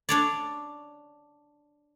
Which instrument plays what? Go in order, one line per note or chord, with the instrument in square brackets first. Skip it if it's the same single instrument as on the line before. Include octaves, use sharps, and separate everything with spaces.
[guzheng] D4 C#5 D5